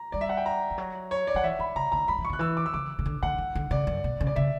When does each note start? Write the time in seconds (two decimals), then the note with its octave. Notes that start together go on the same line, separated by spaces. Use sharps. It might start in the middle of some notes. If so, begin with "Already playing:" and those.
Already playing: A#5
0.12 G3 D5
0.21 E5
0.29 F#5
0.37 G5
0.46 A#5
0.71 E3
0.78 F#3
1.11 C#5
1.27 D5
1.35 F#3 F#5
1.43 E3 E5
1.59 E3 B5
1.76 C#3 A#5
1.92 D3 A#5
2.08 F#3 B5
2.18 E3
2.25 C#6
2.30 D3 F#6
2.39 E3 E6
2.57 D6
2.66 E6
2.74 C#3 D6
2.99 C#3
3.06 D3
3.23 D3 F#5
3.38 E3
3.55 D3
3.71 C#3 D5
3.87 F#2
4.04 B2
4.20 C#3
4.27 D5
4.36 C#3 E5